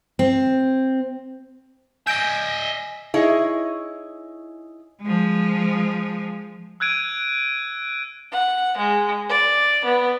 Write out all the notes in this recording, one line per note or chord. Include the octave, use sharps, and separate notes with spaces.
C4
D#5 E5 G#5 G6 D7
D#4 E4 G#4 C#5 D#5
F3 G#3
E6 F#6 G#6 D7 D#7
F#5
G#3
D5
B3